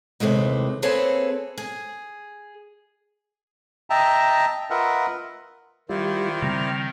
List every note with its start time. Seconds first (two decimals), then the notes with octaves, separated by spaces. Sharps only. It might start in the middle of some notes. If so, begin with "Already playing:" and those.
0.20 D#2 C3 E3 G#3 A3
0.82 A#3 C4 G#4 A4 B4 C#5
1.58 G#4
3.90 D#5 E5 G5 A5 A#5
4.70 F4 A#4 B4 D#5 E5 F#5
5.89 D#3 G3 E4 F4 C5 D5
6.42 C#3 G3 C4 G5 A#5 F6